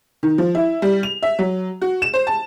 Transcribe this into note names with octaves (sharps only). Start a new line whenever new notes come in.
D#3
F3
E4
G3
F7
E5
F#3
F#4
E7
C5
A5